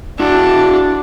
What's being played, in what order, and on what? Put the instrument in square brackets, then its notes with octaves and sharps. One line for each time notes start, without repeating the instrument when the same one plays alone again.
[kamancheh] D4 [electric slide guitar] E4 F#4